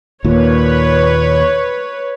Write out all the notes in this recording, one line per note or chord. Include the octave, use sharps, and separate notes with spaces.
D#2 A#2 B4 C#5